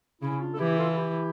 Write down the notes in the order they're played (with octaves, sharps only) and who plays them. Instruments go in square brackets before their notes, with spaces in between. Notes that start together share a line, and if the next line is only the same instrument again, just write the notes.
[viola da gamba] C#3 [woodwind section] C#4 E4
[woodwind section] D4 F4
A4
[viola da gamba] E3 [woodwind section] E4 G4
[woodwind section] F4 A4
F4
E4 G4